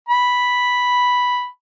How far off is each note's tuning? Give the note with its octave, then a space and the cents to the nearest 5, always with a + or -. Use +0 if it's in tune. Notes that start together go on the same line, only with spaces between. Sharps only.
B5 -5